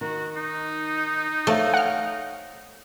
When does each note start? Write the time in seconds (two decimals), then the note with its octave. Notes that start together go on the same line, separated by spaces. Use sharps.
0.01 D#3 F#4
0.36 D#4
1.47 A3 C5 C#5 F5
1.74 F#5 F6